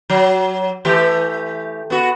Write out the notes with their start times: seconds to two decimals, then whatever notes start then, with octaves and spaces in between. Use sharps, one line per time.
0.10 F#3
0.85 E3 A3 G4
1.90 B3 F#4